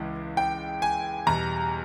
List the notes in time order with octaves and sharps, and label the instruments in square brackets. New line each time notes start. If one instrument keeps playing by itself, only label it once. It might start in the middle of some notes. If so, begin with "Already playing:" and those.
Already playing: [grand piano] C#2 C#3 E3 G#3
G5
G#5
E2 B2 G3 A#5